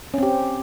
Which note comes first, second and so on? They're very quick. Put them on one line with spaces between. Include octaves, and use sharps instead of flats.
C#4 C4 G4